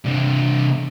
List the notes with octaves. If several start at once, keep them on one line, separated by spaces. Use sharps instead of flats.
C3 D4